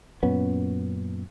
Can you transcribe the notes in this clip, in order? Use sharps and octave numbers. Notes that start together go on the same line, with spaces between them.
F#2 A#2 B3 C#4